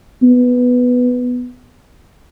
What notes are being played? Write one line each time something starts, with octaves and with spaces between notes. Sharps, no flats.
B3